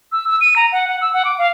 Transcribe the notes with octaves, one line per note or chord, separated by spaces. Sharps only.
E6
E6
D#7
A#5
F#5
F#5
E6
F#5
D6
F5